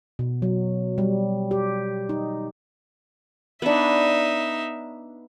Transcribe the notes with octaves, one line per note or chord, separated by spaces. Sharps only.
B2
F#3
G3
G4
D#4
B3 D4 D#4 E5